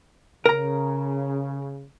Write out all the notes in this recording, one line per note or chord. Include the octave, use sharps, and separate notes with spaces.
C#3 A#4 A#5